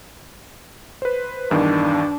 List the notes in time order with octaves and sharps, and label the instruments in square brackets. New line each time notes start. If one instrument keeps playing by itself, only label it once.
[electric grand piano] B4 C5
[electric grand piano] E2 G2 D#3 [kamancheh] D4